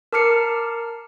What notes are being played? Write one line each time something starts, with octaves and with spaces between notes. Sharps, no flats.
A#4 A5 D6 F6 C7 C#7